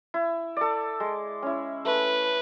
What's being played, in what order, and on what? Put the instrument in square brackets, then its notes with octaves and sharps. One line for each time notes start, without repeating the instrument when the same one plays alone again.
[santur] E4
A4 D5
G#3
C#4 E4
[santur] A3 [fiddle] B4